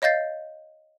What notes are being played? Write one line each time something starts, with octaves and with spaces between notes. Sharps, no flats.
C#5 D#5 F5 G6 A6 C7